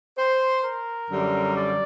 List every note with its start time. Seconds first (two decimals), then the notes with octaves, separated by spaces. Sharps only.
0.17 C5
0.63 A#4
1.08 F#2 D3 G3
1.55 D5